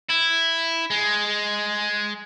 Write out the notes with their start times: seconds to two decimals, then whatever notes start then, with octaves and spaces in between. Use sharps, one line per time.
0.10 E4
0.90 G#3